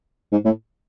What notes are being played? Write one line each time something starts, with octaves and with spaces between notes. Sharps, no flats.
G#2
A2